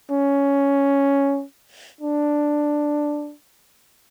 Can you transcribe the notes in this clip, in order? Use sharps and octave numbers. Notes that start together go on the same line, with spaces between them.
C#4
D4